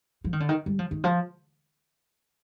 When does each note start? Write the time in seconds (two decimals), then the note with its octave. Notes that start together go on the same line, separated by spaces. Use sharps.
0.24 F3
0.33 D#3
0.40 D3
0.49 D#3
0.66 G3
0.79 F3
0.91 D#3
1.04 F3